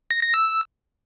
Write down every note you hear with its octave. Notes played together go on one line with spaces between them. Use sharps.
A#6
A#6
E6